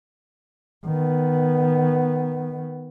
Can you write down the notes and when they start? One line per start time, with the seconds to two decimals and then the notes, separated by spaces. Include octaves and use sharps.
0.86 D#3 B3